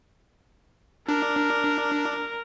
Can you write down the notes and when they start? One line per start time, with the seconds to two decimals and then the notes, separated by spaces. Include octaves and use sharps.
1.09 D4 A#4